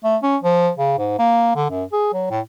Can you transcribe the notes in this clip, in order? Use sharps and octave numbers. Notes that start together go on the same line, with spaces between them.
A3
C#4
F3
C#3
G#2
A#3
D3
F#2
G#4
F#3
A2